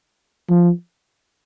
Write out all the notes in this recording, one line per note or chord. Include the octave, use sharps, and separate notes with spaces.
F3